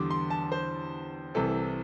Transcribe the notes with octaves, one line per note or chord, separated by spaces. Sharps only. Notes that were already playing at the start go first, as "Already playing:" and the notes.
Already playing: E2 D3 G3 C6 D6
C6
A5
C5
C2 C3 E3 C4 A4